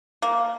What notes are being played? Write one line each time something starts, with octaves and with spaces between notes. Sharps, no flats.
A#3